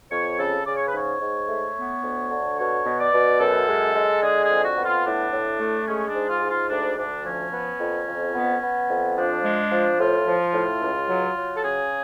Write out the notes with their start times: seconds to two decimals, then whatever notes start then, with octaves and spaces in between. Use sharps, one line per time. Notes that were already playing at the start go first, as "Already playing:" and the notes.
0.11 F2 C#5
0.39 C#3 A4
0.66 C#3 D5
0.76 C#5
0.87 B4
0.94 G#2 C#5
1.21 G#2
1.49 A3
1.76 B3
2.03 D2
2.31 D3
2.58 B2 C#5
2.86 B2
3.00 D5
3.13 B2
3.40 F#2 A4
3.68 G#3
3.95 G#3
4.22 D3 G#4
4.44 G#4
4.50 F2
4.63 F#4
4.78 B3
4.85 F4
5.05 A2 D4
5.33 A2
5.60 A3
5.88 G#3 C#4
6.09 D4
6.15 G#2
6.29 F4
6.43 G#2
6.49 F4
6.70 D2 D4
6.97 D2 D4
7.25 F3 C#4
7.53 B3
7.80 F2
8.07 F2
8.35 B3
8.62 B3
8.90 F2
9.17 F3 D4
9.45 G#3
9.72 F3
9.99 A2 F4
10.26 F3
10.54 A2
10.81 C#2
11.09 F#3
11.36 F#3
11.56 A4
11.63 C#3 G#4